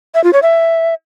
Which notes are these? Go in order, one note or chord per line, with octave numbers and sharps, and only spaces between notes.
E5
F4
C#5
E5